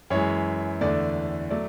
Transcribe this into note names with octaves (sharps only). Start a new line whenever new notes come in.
F#2 E3 G#3 C#5
E2 D3 A3 D4 D5
F#3 A3 D5